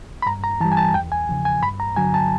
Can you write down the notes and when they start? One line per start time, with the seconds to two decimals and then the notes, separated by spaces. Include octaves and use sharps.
0.22 B5
0.26 G2 A#5
0.44 A#5
0.61 E3 A5
0.65 G3
0.72 G#5
0.77 A5
0.94 E2 G5
1.12 G#5
1.29 C#3 F3
1.45 G#5
1.62 G2 B5
1.80 A#5
1.96 D3 F#3 G#5
2.14 A5